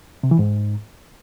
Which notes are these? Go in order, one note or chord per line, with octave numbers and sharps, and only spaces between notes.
C3
E3
G#2